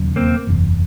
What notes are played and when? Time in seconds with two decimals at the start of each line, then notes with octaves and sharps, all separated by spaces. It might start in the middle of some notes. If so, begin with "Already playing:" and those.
Already playing: E1 D#2 C#3 F#3
0.16 A#3 C4
0.47 F#1 E2 C3